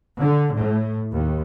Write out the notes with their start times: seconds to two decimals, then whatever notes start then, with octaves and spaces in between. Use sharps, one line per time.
0.19 D3
0.52 A2
1.12 D#2